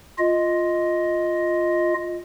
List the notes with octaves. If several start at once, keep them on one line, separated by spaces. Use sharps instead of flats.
F4 D#5